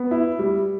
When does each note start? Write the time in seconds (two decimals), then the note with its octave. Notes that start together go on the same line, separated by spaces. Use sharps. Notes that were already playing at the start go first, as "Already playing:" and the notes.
Already playing: B3
0.11 E4
0.39 G3